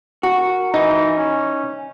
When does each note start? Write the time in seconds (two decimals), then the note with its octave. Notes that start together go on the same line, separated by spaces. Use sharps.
0.23 F#4 A#4
0.74 E3 D#4
1.16 C#4